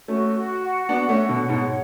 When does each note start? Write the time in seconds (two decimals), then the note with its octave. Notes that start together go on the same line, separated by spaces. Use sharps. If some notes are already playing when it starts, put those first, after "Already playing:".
0.08 A3 C#4 F#4
0.35 F#4
0.62 F#5
0.89 B3 D4 F#4
1.09 A3 C#4
1.15 F#5
1.29 B2 D3
1.42 C#5
1.49 G#2 B2
1.69 C#5